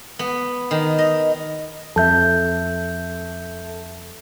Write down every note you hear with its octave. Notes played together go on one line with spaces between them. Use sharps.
B3
D#3
D#5
F2 A4 E5 A5 G6